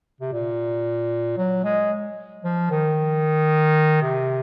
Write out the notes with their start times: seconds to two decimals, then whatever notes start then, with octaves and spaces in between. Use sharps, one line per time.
0.21 C3
0.33 A#2
1.38 F#3
1.64 G#3
2.44 F3
2.70 D#3
4.02 C3